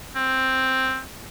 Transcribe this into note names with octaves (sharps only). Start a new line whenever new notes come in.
C4